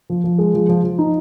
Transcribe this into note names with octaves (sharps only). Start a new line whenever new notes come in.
F3
F3
G#3
F3
F3
F3
D#4